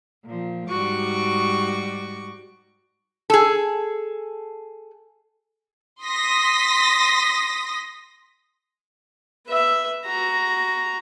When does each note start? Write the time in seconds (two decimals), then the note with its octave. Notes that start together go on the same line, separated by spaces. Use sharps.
0.25 A#2 F3
0.69 G#2 G3 F#4 C#6 D6
3.30 G#4 A4
6.03 C6 D#6 A#6 B6
9.47 B4 E5
10.06 F#4 A#5